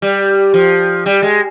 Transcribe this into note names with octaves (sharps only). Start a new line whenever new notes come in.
G3
F3
G3
G#3